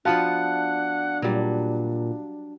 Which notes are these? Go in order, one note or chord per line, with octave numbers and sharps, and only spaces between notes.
F3 B3 D4 F4 F#4 F5 F#5 A5
A#2 F#3 G3